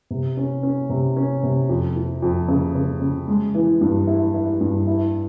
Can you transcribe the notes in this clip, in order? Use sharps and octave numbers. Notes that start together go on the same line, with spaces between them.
C3
C#4
C#4
C3
C#4
C3
F2
F3
F2
C#3
C#3
C#3
G#3
E3
G2
E4
E4
G2
E4